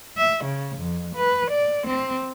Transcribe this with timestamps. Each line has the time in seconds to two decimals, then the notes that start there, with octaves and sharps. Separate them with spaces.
0.16 E5
0.45 C#3
0.77 F2
1.15 B4
1.50 D5
1.87 C4